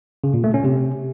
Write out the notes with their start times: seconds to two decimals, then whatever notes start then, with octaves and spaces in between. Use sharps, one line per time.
0.24 C#3
0.34 A#2
0.44 A3
0.54 C#4
0.64 C3